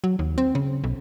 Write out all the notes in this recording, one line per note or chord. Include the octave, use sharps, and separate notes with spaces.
F#3
D#2
C4
C#3
B1